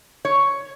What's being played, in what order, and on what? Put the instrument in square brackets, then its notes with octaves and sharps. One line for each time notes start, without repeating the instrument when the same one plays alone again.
[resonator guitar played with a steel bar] C#5